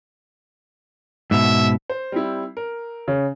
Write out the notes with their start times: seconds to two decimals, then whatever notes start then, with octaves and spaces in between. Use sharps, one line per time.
1.31 G#2 B2 E5
1.90 C5
2.12 G3 C4 E4
2.57 A#4
3.08 C#3